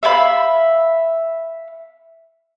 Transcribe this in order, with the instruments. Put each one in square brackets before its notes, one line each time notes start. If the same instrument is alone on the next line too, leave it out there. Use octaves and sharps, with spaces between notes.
[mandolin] E5 F5 G#5 B5